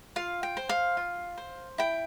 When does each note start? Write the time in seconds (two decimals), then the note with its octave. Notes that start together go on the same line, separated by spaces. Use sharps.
0.16 F4 F5
0.43 G5
0.57 C5
0.69 F5
0.97 F4
1.37 C5
1.78 E4 G5